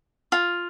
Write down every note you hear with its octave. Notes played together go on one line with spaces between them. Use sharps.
F4